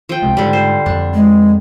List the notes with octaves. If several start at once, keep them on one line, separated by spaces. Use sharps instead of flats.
F3 G5
C2 C3 G#3
G#2 D3 G3
C5
F2 D3 D4
G#3